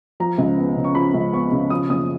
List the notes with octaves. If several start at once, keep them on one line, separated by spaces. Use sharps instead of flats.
F3 A#5
C#2
B3
C#3
C#6
F3 B5
C#2
B3 C#6
C#3
F3 D#6
F#1 D#6